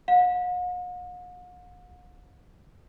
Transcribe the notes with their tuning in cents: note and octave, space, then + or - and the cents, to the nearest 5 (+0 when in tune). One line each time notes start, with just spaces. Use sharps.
F#5 -45